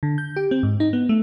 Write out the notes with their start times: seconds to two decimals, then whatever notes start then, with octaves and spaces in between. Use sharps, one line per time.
0.03 D3
0.18 G6
0.36 G4
0.51 C4
0.63 G#2
0.80 D#4
0.93 B3
1.09 A3